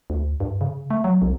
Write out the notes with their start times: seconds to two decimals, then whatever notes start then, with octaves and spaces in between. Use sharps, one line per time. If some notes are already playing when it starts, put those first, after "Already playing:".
0.10 D2
0.40 G2
0.61 C#3
0.90 A3
1.04 F#3
1.22 C2